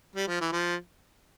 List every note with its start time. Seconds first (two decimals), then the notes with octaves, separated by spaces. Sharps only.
0.16 G3
0.27 F3
0.40 E3
0.52 F3